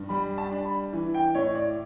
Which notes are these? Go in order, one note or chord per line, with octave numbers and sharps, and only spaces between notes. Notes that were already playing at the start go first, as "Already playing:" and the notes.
Already playing: G2
G3 B5
A5
D4
B5
E3
G5
A2 C#5
D5